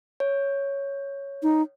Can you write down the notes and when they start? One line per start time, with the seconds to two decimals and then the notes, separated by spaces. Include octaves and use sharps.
0.20 C#5
1.43 D#4